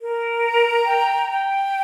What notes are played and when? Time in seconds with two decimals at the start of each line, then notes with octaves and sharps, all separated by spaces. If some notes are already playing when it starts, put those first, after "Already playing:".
0.01 A#4
0.44 A#5
0.86 G5
1.29 G5